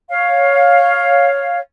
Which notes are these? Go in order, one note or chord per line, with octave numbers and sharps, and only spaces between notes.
C#5 F5